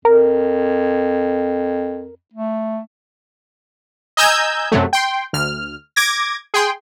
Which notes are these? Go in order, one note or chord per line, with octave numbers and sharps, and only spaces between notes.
F2 A#4
A3
D#5 G#5 A#5 E6 G6 G#6
F#2 C3 F#3 A3
G5 C6
D2 F6
D6 G#6 A#6
G#4 G5 C6